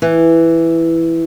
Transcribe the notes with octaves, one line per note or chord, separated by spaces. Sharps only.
E3